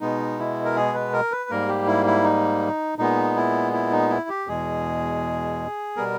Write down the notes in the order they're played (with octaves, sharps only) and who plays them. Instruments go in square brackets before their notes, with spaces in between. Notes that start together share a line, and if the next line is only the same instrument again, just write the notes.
[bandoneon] B2 G#3 B3 D#4
E4
A#4
G#4
B4
A#4
B4
G#2 G3 A#3 A#4
G4
E4
E4
D#4
A#2 G#3 B3 D#4
E4
E4
D#4
E4
G4
E2 B2 G#3 G#4
B2 G3 B3 A#4